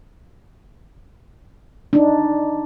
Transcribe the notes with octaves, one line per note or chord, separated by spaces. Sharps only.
D4 D#4